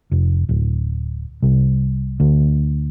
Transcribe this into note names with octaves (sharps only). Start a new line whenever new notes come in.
F1
D1
C2
D2